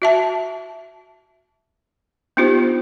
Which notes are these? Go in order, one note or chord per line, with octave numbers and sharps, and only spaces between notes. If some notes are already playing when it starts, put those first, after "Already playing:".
F#4 E5 A5
B3 D4 D#4 F4 G4 C5